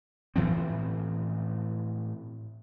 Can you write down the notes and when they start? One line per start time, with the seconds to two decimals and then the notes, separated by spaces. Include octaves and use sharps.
0.36 A2 E3 F3 C4